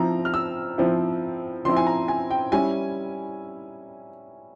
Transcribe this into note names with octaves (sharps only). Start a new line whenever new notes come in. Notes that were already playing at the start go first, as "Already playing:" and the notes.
Already playing: F3 C4 E4 A#5
F6
E6
F3 C4 E4
F3 C4 E4 C6
G#5
A#5
G#5
G5
G3 C#4 E4 G#5